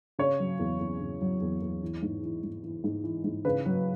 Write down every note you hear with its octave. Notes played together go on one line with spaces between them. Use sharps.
C#3 C#5
F#3
E2
E2
C#3
F#3
E2
E2
E3
G#2
E3
G#2
E3
G#2
E3
G#2
C#3 B4
F#3